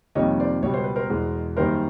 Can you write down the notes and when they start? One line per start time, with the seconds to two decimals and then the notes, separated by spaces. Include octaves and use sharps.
0.15 F2 C3 D#3 G3 A#3 C#5 D#5
0.40 C5 D5
0.62 C#2 B2 G3 C#5
0.74 C5
0.84 B4
0.96 A#4 C5
1.10 E2 B2 G#3
1.57 F#2 D#3 G3 A#3 A#4 C5